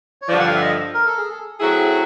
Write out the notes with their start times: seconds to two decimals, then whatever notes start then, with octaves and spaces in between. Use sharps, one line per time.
0.22 C#5
0.28 G2 D3 F3 D5
0.40 F#5
0.47 F5
0.54 E5
0.62 D#5
0.94 A#4
1.06 A4
1.18 G#4
1.29 A4
1.60 F#3 A3 C4 E4 G#4 A4